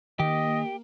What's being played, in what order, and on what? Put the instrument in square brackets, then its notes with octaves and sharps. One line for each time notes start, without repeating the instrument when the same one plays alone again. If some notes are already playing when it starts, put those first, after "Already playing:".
[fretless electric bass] D#3 [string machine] A#3 [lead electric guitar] G4 [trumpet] D#5